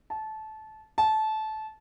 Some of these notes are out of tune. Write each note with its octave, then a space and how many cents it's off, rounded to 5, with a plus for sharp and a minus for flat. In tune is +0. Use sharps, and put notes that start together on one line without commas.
A5 -20
A5 -20